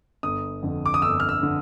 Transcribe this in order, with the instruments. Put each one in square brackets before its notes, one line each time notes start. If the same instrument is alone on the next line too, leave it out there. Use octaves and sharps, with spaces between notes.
[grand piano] G1 D#6
F2 D3
D6
D#6
G1 E6
F6
E6
D3